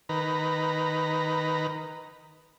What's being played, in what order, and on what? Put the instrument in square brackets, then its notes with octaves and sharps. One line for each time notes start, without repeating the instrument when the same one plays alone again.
[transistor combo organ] D#3 B4 A#5